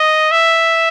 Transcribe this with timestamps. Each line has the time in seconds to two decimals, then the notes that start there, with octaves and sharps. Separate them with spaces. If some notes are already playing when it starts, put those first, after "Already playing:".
Already playing: D#5
0.31 E5